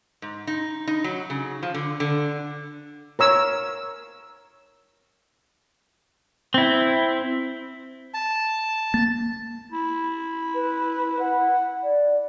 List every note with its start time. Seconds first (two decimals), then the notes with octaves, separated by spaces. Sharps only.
0.22 G#2
0.47 D#4
0.88 D#4
1.04 F#3
1.30 C#3
1.63 F3
1.74 D3
2.00 D3
3.19 A#4 C#5 E6
6.54 C4 E4
8.14 A5
8.94 A#3 A6
9.72 E4
10.55 B4
11.20 F#5
11.83 D5